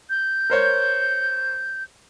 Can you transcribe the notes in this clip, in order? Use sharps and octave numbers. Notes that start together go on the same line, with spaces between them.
G6
A#4 C5 C#5